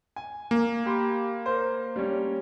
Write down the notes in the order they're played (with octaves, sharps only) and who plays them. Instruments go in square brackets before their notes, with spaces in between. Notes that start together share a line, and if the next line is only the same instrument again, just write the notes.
[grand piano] G#5
[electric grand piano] A#3
[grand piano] G4 B5 C6
A#4 C5
G3 C#4